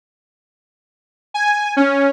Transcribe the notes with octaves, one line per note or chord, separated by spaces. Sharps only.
G#5
C#4